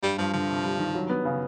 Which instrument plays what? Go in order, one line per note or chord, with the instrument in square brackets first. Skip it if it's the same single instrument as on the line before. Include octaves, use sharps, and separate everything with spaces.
[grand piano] G2 [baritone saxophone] G3
[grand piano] G2 [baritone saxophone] F3
[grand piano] D3 [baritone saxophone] F3
[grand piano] C3
G3
D#3
F#3
B3
C#3